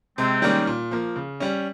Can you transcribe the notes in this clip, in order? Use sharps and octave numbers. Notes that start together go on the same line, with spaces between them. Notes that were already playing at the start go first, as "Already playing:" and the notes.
C3 G#3 C4
D#3 G3 A#3 C#4
A#2
F3 A#3
C#3
G3 C#4